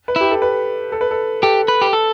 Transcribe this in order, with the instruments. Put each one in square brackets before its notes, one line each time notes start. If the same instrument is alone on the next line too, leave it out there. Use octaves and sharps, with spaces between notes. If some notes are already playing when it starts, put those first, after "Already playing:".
[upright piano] B4
[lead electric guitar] E4 [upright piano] G4
[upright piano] A4
B4
A4
B4
A4
[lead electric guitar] G4 [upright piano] A4
[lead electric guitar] B4
G4
A4